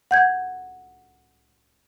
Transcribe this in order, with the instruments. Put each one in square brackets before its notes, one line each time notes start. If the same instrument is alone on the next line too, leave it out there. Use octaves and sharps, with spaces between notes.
[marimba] F#5 G6 G#6